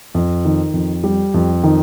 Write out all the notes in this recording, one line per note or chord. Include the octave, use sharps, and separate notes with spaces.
F2
D#3
F2
G3
F2
D#3